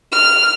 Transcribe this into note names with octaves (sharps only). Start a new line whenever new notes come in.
F6